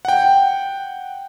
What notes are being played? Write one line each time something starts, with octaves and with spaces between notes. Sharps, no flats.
F#5 G5